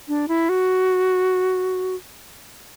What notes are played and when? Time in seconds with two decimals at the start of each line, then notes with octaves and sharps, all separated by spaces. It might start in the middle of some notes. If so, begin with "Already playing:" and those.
0.08 D4
0.28 E4
0.49 F#4